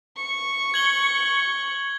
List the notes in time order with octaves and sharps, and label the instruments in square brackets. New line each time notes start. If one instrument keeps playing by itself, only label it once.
[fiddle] C#6
[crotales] G#6 F#7 G7